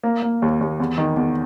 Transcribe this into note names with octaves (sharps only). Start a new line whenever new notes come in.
A#3
A#3
D#2
D#2
E2
D#3
E2